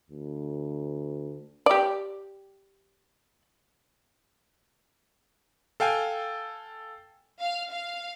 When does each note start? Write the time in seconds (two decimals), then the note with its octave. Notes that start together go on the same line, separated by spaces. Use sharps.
0.11 D2
1.66 G4 D5
5.80 A4 F5 G5 G#5
7.40 F5
7.70 F5